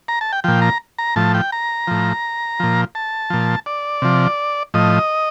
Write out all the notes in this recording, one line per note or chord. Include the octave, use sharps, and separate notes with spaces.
A#5
A5
G5
A#2 F3 G5
A#5
A#5
A2 F3 A5
G5
A#5
A2 F3
A#2 F3
A5
A#2 F3
D5
C3 F3
A2 F3 D#5